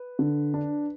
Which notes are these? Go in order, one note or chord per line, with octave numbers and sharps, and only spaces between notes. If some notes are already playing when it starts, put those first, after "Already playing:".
Already playing: B4
D3
D4